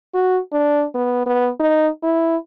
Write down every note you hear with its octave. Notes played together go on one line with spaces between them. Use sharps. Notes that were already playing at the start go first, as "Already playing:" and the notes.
F#4
D4
B3
B3
D#4
E4